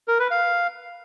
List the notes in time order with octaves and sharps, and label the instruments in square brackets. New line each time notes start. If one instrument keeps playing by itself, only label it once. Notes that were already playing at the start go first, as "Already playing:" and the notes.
[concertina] A#4
B4
F5